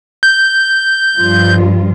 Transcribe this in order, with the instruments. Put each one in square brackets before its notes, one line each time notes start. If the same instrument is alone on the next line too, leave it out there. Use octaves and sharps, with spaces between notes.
[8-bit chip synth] G6
[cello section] G2 F3 F4